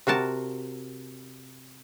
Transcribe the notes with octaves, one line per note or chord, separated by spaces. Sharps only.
C3 F#4 A#4 A5